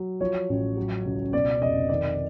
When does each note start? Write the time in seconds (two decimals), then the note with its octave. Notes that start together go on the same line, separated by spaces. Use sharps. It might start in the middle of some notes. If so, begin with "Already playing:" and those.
Already playing: F#3
0.20 F3 C#5
0.49 A1
0.77 F#3
1.05 C#2
1.33 B2 D5
1.61 F1 D#5
1.89 D#3 D5